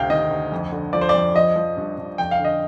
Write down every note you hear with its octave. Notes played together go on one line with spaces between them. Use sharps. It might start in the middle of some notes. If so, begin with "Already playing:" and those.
Already playing: D2 C3 F5 G5
D#3 D#5
D2
F2
D3
F3 D5
C5
F2 D5
F3 D#5
F3
G2
G2
F2 G5
F5
D3
D#5